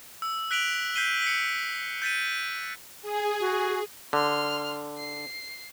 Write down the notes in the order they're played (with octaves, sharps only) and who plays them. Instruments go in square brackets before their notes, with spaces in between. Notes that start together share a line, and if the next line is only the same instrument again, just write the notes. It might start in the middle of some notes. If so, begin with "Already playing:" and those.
[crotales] E6
F#6 B6 D7 F7 F#7
G6 B6 C7 D#7 G7
B6 C#7
G6 A6 B6 D#7
[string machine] G#4
[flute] F#4
[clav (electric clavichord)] D3 [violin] C6 F6
[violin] C7